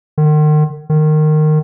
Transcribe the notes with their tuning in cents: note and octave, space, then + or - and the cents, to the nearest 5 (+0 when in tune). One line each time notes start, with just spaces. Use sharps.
D#3 -40
D#3 -20